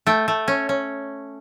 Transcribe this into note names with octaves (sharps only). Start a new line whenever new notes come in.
A3 G5
A3
C#4
C#4